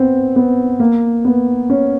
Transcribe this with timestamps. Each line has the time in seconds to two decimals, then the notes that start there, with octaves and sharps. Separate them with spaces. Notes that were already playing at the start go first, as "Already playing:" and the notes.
Already playing: B3 C4
0.36 B3
0.80 A#3
1.25 B3
1.70 C#4